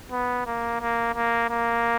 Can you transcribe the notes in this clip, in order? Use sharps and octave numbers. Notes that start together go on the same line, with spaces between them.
B3
A#3
A#3
A#3
A#3